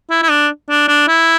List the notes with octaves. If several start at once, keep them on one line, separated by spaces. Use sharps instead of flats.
E4
E4
D4
D4
D4
E4